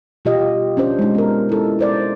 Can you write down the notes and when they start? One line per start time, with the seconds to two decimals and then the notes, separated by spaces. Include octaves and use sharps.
0.25 B2 F4 G4 D#5
0.77 C#4 D4 C5
0.99 G#3 D#4
1.15 B3 A#4
1.49 E4 A4
1.79 D#4 C5 D5